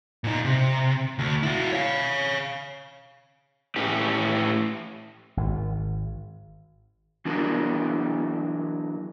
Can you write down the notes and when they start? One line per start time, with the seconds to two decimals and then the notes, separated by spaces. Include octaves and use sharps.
0.24 A#2 D#4
0.45 C3
1.19 D2
1.43 E4 F#4
1.73 C#5 F5
3.76 A2 C#4 G4
5.37 G#1
7.25 E3 F#3 D4 F#4 G#4 A#4